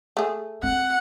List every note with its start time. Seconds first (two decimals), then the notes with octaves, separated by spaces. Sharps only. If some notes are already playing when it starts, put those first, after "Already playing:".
0.17 A3 G#4
0.63 C4 F#5